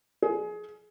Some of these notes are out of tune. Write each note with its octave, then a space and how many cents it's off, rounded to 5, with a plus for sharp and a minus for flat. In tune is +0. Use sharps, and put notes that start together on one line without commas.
G#4 +20